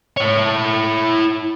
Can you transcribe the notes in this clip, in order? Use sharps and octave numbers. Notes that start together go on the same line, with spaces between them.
E4 C#5